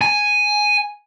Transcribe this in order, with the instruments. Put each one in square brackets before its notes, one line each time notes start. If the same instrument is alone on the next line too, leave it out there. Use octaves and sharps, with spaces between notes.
[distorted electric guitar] G#5